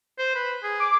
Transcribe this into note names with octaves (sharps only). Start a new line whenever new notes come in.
C5
B4
G#4
D6